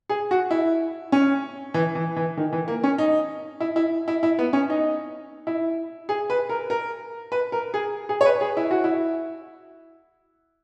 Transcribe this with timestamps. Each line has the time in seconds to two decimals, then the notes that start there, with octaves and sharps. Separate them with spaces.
0.09 G#4
0.31 F#4
0.51 E4
1.12 C#4
1.74 E3
1.95 E3
2.16 E3
2.37 D#3
2.53 E3
2.68 A#3
2.84 C#4
2.98 D#4
3.60 E4
3.76 E4
4.08 E4
4.23 E4
4.39 B3
4.53 C#4
4.70 D#4
5.47 E4
6.09 G#4
6.30 B4
6.49 A#4
6.70 A#4
7.32 B4
7.52 A#4
7.74 G#4
8.09 G#4
8.21 C#5
8.25 B4
8.41 G#4
8.57 E4
8.71 F#4
8.84 E4